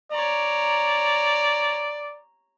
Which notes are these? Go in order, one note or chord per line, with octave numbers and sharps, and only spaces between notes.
C#5 D5 A#5